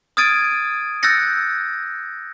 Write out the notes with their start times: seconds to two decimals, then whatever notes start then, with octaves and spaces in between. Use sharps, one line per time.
0.17 D#6 F6 G#6 A6 D7 D#7
1.03 E6 F#6 G6 A6 A#6 C#7